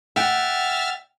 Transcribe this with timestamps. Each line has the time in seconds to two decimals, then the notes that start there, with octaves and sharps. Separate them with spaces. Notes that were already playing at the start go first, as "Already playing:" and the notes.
0.16 E5 F#5 G5 F6 A6